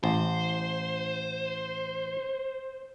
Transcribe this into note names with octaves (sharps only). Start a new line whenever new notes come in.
A1 C5